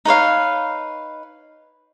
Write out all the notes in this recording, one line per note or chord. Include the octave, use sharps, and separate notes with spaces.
D#4 B4 C#5 F5